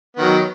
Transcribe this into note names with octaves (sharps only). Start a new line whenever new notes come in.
D#3 F#3 B3